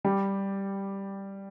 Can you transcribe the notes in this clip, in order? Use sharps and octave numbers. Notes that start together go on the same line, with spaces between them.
G3 G4